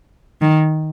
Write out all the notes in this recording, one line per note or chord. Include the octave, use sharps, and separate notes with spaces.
D#3